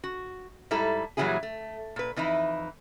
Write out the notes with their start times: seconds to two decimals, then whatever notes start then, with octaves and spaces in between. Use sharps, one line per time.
0.04 F#4
0.71 G#2 G3 E4 A4 A#5
1.17 A#2 E3 F#3 G3 E4 G#4
1.43 A3
1.96 A#2 B4
2.16 F2 E3 D#4 E4